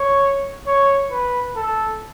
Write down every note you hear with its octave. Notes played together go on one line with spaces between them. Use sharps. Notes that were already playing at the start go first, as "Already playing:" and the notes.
Already playing: C#5
C#5
B4
A4